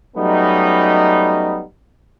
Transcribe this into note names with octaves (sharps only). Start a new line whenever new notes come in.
F#3 G3 A3 B3 C#4 D#4